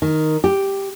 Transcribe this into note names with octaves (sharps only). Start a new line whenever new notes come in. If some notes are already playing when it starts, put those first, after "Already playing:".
D#3
G4